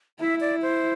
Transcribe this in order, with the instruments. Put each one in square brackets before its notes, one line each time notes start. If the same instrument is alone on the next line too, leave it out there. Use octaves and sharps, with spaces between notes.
[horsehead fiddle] E4 [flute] E5
[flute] D5
C5